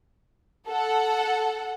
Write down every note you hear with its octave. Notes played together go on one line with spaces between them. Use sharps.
A4 F#5